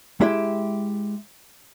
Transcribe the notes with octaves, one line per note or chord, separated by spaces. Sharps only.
G#3 E4 G4 E5